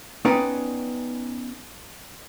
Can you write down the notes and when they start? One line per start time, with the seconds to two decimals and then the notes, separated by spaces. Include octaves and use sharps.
0.25 B3 C#4 D#4 B4 D5 G5